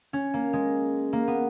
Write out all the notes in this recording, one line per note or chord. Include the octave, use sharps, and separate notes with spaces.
C#4
A#3
G#3
A#3
B3